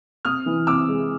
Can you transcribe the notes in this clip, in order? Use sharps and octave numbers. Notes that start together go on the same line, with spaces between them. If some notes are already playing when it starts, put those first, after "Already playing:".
C3 D#6 F6
E3
C3 D6 E6
G#3